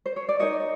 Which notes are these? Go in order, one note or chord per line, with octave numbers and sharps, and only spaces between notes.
C5
C#5
D5
D#4 F#4 A#4 C#5 D#5